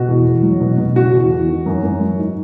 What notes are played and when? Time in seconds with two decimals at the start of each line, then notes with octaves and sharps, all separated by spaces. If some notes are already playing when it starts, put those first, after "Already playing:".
Already playing: B2 F#4
0.08 E2
0.26 E2
0.43 F#3
0.60 B2
0.78 B2
0.96 C#3 F#4
1.14 E2
1.30 E2
1.49 D#3
1.66 F#2
1.83 F#2
2.00 F#3
2.18 G#2